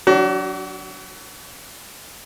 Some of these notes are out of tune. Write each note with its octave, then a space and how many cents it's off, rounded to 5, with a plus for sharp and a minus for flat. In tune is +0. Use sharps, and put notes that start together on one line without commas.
F#3 +0 D4 -20 F#4 +35